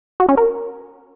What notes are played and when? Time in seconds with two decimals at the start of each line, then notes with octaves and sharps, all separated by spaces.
0.20 F#4
0.29 C#4
0.37 A#4